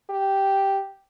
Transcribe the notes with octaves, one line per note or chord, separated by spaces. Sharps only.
G4